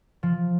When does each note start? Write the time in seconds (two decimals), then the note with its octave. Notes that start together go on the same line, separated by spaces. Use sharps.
0.23 F3